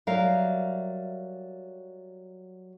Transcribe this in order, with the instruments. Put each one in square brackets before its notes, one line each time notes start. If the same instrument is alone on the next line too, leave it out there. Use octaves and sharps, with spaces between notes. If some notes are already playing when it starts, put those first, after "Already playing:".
[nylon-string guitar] F#3 G3 A#4 E5 F5